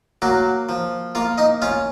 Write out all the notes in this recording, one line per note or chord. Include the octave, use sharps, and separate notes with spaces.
F#3 A#3 F#4
F3
A#3 F4 F5
D#4 D#5
C#4 F4 F5